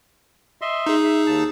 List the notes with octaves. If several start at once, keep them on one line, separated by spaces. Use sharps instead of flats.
D#5 E5 C6
D#4 G#4
E5
D#2 A5